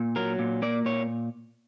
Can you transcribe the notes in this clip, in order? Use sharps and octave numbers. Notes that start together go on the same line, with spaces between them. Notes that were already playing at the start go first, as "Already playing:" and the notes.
Already playing: A#2
F#3 A#4
A#2
A#3 D5
A#2 C#5